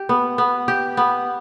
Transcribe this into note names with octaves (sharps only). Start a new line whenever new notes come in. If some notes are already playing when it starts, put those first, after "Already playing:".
Already playing: G4
B3
B3
G4
B3